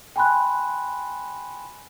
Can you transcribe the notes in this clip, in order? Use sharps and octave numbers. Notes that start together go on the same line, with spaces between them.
G5 G#5 B5 C6 F#6